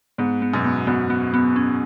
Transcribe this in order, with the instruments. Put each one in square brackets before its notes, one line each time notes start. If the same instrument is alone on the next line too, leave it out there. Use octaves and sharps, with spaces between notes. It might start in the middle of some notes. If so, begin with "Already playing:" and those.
[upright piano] G#2 [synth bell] B3
[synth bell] B3
[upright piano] F#2 B2
[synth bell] B3
[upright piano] F#2 B2 [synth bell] B3
[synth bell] B3
B3
C#4